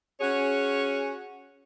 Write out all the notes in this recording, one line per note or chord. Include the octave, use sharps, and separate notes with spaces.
C#4 F#4 G#4 C#5